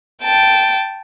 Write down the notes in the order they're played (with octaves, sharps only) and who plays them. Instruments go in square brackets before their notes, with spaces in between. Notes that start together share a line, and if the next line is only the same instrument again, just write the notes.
[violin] G5 A5